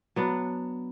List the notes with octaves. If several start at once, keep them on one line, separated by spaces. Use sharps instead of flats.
F#3 B3 D4